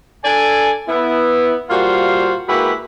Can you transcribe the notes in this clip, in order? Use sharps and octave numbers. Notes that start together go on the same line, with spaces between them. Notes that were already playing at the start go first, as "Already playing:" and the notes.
D4 A4 D5 G#5
B3 E4
A#2 G3 F4 F#4 C5 F5
G#3 A#3 E4 F#4 G4 B4